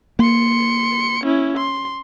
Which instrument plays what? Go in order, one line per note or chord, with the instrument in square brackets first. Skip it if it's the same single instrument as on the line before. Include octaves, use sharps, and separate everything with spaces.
[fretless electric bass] A#3 [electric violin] C6 C#7
[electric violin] C#4 E4
C6